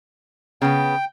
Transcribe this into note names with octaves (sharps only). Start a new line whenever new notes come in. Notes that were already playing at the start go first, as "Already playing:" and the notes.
C#3 B3 G5